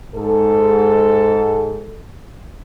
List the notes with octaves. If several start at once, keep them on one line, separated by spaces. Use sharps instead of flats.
G#2 A4